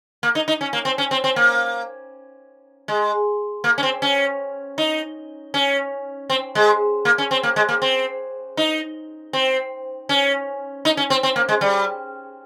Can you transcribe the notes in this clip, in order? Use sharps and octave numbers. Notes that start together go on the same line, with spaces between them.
A#3
D#4
D#4
C#4
A#3
C4
C#4
C4
C4
A#3
G#3
A#3
C#4
C4
C#4
D#4
C#4
C4
G#3
A#3
C#4
C4
A#3
G#3
A#3
C4
D#4
C4
C#4
D#4
C#4
C4
C4
A#3
G#3
G3